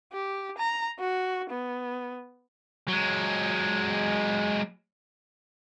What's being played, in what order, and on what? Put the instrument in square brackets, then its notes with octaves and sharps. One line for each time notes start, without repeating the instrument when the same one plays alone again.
[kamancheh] G4
A#5
F#4
B3
[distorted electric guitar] F#3 G#3